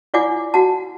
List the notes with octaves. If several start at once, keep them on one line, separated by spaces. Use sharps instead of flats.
E4 F4 D5 F#5 G#5 D6
F#4 F#5 A5